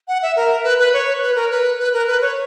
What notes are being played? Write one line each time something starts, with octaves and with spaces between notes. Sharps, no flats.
F#5
E5
A#4
B4
B4
C#5
B4
A#4
B4
B4
A#4
B4
C#5